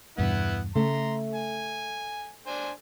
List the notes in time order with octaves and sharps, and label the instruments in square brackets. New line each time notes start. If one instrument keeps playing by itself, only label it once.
[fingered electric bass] E2 G2 B2 [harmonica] B3 E4 F#5
[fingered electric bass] C#3 [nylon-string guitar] A3 [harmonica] A#5 C6
[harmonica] G#5
D4 C5 G#5